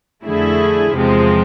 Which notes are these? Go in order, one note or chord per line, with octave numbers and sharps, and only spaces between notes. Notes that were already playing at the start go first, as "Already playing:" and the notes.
F2 D3 A3 E4 G#4
E2 C3 F3 G#3 C4